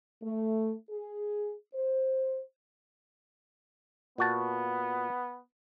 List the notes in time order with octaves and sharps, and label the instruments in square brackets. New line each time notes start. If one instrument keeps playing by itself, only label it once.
[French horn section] A3
G#4
C5
[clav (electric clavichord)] A#2 F#4 A5 [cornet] B3